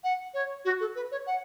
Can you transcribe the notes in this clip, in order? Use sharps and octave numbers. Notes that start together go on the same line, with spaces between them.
F#5
C#5
F#4
A4
B4
C#5
F#5